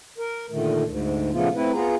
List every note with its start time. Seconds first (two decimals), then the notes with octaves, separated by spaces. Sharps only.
0.18 A#4
0.50 A#2 D3 D#3 A3
0.85 D2 G#2
1.32 A#2 C#3 F3 A3 B3 F4
1.55 A3 C4 E4 B4
1.73 B3 F4 G#4 A#5